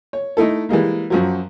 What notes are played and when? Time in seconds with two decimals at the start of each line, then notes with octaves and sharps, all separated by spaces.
0.13 C#5
0.37 A3 D#4 E4 A4
0.69 E3 G3 G#3 A#3
1.10 F#2 F3 F#3